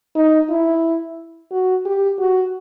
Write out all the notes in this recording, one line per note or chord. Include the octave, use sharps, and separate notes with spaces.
D#4
E4
F#4
G4
F#4